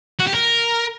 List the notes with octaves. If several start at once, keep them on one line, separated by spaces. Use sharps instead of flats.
F#4
G4
A#4